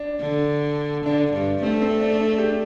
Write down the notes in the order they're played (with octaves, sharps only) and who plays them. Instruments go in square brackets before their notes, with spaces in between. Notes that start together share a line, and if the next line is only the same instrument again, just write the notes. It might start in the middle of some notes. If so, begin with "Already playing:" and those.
Already playing: [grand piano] D4
[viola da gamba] D3
[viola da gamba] D3 [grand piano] D4
[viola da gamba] G2
[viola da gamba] A3 [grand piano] C4
[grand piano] C4
D4
D4
D4 G4